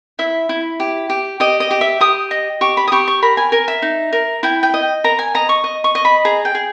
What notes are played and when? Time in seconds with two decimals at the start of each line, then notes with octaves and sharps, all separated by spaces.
0.19 E4 E5
0.49 E4
0.80 G4
1.10 G4
1.40 G4 D#5
1.60 D#5
1.71 G4
1.81 E5
2.01 G4 D#6
2.31 D#5
2.61 G4 C#6
2.77 B5
2.88 D#6
2.92 G4 C#6
3.08 C#6
3.22 A#4 B5
3.37 G#5
3.52 A#4 G#5
3.68 E5
3.82 D#4
4.13 A#4
4.43 E4 G5
4.63 G5
4.74 D#5
5.04 A#4 A#5
5.19 G#5
5.35 D#5 A#5
5.49 C#6
5.64 D#5
5.84 C#6
5.95 D#5
6.05 B5
6.25 G#4 A#5
6.45 G5
6.55 G#4